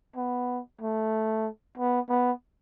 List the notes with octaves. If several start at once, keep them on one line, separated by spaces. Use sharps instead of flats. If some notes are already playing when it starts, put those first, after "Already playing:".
B3
A3
B3
B3